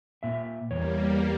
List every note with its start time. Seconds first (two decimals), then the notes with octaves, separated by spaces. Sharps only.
0.23 A#2 E5
0.71 E2 G3 A#3 C#5